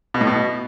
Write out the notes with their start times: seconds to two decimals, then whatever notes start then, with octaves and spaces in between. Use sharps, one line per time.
0.14 B2
0.21 A2
0.27 B2